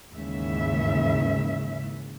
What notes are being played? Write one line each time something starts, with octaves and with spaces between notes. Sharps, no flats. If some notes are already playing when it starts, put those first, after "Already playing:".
D#2 G#2 C#3 E3 E5